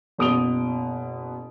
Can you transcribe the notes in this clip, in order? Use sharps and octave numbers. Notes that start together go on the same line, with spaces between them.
F#1 B2 D#6 D7 F7 G7